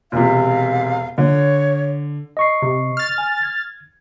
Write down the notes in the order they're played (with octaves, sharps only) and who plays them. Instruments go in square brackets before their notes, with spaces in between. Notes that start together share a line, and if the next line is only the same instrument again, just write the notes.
[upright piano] E1 C3 [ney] F5
[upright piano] D3 [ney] C#5
[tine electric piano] D#5 C#6 C7
[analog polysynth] C3
F6 A6
[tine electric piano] G#5
G#6